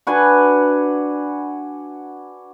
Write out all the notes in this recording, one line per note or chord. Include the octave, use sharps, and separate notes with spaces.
D4 F#4 B4 G#5